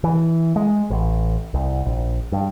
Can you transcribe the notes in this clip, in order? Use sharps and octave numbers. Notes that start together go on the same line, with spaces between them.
E3
G#3
A1
C2
A#1
G2